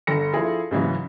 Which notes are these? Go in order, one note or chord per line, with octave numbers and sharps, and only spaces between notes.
G1 A4 A#6 C#7
F3 E4 G#4 A4
G#2 C#3 E3 F#3